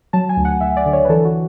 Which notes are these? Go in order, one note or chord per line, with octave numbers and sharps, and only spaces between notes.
F#3 A5
G#5
D2
F#5
D2 E5
D5
D3
C#5
B4
E3 A4
F#4